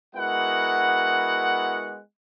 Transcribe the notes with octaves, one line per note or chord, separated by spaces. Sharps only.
G#3 B3 E4 F#4 A#4 F#5